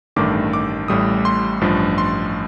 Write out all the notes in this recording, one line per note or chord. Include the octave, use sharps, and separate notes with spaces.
A1 G2 D#3 A3 D6
D6
A1 A2 G3 D#6
C6
A1 G2 F3
C6